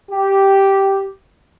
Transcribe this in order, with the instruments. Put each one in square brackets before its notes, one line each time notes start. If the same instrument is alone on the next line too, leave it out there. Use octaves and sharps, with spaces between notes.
[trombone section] G4